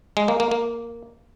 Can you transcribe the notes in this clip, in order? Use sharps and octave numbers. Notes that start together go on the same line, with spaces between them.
G#3
A#3
A#3
A#3